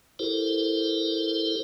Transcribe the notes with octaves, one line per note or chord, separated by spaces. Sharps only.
E4 G4 A4 A#4 C5